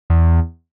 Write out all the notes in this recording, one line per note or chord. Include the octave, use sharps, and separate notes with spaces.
E2